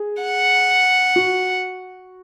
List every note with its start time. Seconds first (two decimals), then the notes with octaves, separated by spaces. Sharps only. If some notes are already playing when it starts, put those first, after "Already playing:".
Already playing: G#4
0.22 F#5
1.16 F#4